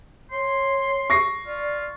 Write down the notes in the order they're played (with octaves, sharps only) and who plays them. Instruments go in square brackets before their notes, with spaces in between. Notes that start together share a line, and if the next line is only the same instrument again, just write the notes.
[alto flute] C#5 [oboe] C6
[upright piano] C#6 A#6 C7
[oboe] F4 [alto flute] D5